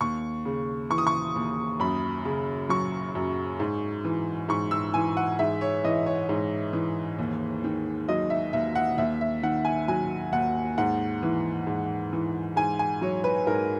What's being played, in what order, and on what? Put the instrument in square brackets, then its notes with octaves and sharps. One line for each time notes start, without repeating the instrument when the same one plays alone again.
[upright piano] D#2 C#6
C#3
E3 C#6
D#6
C#6
D#2
F#2 B5
C#3
F#3 C#6
F#2
G#2
E3
G#2 C#6
E6
E3 G#5
F#5
G#2 E5
C#5
E3 D#5
C#5
G#2
E3
D#2
D#3
F#3 D#5
E5
D#2 E5
F#5
D#2 E5
E5
D#3 F#5
G#5
F#3 G#5
D#2 F#5
G#2 F#5
E3
G#2
E3
G#2 G#5
G#5
F#3 C#5
B4
G#2 A#4